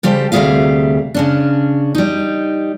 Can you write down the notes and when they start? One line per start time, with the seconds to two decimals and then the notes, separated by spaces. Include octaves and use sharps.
0.03 C#3 G3 G4 A4 C5
0.32 D2 C3 G3 G#4 E5 F5
1.14 C#3 C#4 D4
1.95 G3 D#4